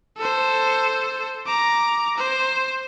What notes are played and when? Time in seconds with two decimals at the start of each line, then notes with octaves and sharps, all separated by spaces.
0.17 A4 C5
1.46 A#5 D6
2.17 C5